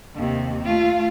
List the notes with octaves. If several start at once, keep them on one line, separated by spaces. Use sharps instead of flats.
D#2 C3
A3 F4